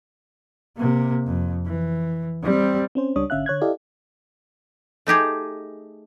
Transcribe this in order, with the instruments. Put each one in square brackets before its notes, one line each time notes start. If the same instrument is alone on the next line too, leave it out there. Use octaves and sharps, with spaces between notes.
[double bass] C3 A#3
F2
E3
G3 C4
[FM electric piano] C4 C#4 C5
C#2 G3 D4 C#5 D#6
G#1 D3 C#4 E5 F5 F#6
D3 C#5 F#6 G#6
E4 G4 A4 D5 D#5 F5
[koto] A3 D#4 G4 G#4